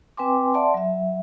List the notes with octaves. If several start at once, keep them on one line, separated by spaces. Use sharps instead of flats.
C4 B4 G5 G#5 C6 D6
D5 E5 F#5 A5 C6
F#3 E5